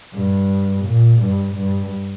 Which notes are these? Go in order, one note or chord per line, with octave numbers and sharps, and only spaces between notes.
G2
A#2
G2
G2